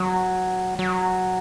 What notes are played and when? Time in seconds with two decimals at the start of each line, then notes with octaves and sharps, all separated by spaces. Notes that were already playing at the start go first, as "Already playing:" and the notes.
Already playing: F#3
0.79 F#3